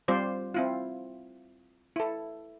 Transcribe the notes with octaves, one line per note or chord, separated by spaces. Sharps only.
G3 C4 F4 C5 D5
C4 E4 F4
E4 A4